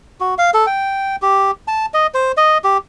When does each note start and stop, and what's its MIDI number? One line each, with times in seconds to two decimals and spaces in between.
0.20 0.35 66
0.38 0.51 77
0.54 0.66 69
0.67 1.16 79
1.22 1.51 67
1.68 1.86 81
1.94 2.07 75
2.14 2.32 72
2.37 2.58 75
2.64 2.78 67